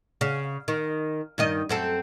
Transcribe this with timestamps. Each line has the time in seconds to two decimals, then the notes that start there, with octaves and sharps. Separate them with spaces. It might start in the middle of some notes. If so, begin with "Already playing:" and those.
0.21 C#3
0.68 D#3
1.38 G2 D#3 D#5
1.69 F#2 C4 A4